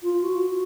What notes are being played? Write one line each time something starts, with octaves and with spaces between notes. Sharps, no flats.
F4
F#4